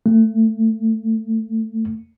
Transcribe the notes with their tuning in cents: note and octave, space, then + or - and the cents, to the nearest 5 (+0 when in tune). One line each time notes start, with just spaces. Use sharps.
A3 +30